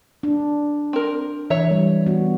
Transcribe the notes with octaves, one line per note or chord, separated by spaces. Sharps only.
D4
C4 A#4
E3 C#5 E5
G3
B3 F#4